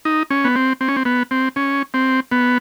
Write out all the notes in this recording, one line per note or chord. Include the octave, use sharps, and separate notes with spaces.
D#4
C#4
B3
C4
C4
C#4
C4
B3
C4
C#4
C4
B3